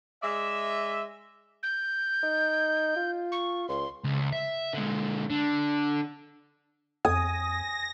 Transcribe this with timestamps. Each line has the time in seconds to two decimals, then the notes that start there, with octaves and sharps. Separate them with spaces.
0.23 G#3 D5 E5
1.63 G6
2.23 D#4
2.96 F4
3.32 C#6
3.69 C#2 C6
4.04 C#2
4.32 E5
4.73 D3 G#3
5.30 D3
7.05 F2 G#5 D#6 A#6